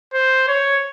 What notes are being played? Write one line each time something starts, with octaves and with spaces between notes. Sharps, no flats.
C5
C#5